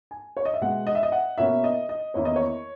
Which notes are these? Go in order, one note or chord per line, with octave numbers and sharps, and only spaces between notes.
G#5
C#5
D#5
E5
B2 G#3 B3 F#5
D#5
E5
D#5
F#5
B2 A#3 C#4 E4 E5
D#5
D#5
E2 D#3 A#3 C#4 E4 C#5
D#5
C#5